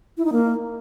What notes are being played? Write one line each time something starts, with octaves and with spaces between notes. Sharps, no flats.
E4
D#4
A#3